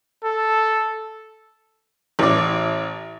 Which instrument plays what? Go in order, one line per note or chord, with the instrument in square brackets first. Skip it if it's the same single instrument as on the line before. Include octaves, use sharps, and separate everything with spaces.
[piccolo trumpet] A4
[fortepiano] A1 D5